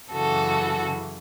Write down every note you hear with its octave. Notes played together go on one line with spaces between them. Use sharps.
F#2 C#3 E3 F#4 A4